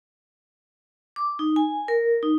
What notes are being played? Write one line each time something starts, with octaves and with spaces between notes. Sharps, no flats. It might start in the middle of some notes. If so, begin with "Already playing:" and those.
D6
D#4
G#5
A#4
D#4